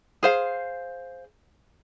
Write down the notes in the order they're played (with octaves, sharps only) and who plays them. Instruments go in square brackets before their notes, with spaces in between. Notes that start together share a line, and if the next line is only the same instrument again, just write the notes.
[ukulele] G#4 C5 F5